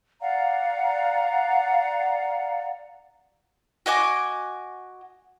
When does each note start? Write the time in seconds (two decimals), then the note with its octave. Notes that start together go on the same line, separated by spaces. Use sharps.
0.21 D5 F5 F#5 A#5
3.86 F#4 D#5 G#5 D6